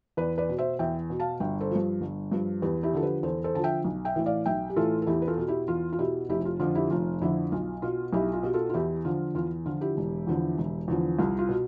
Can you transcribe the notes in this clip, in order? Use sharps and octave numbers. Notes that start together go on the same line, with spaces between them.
E2 B4 D5
B4 D5
B2
C5 E5
E2 E5 G5
B2
F5 A5
G1 E5 G5
A4 C5
G2 F3
G1
G2 F3
E2 G4 B4
E4 G4
D3 F3 A4
G4 B4
E2 A4 C5
A4 C5
D3 F3 A5
E5 G5
B1
E5 G5
A2 E3
D5 F5
B1 E5 G5
G4
A2 E3 F4 A4
A4
E2 E4 G4
B4
F4 A4
B2
E4 G4
E2 F4
F4
B2 E4 G4
F1 E4 G4
G4
F4
F2 D3 F3 F4
E4 G4
F1 F4
F2 D3 F3 E4
B1 F4
B2 F4
B1 E4 G4
F4
B2 G4
F4 A4
F4
E2 E4 G4
D3 F3 F4
E2 F4
D3 F3 F4
E4 G4
E1
E2 D3 F3
E1
E2 D3 F3
C2 F4
F4
B2